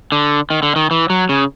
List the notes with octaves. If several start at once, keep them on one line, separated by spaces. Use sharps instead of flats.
D3
D#3
D3
D#3
E3
F#3
C#3